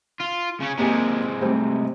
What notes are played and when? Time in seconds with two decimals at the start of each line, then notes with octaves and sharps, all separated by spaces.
0.20 F4
0.60 C#3 C#4
0.78 C3 G#3 A#3 G4 G#5
1.41 G3 A3 C4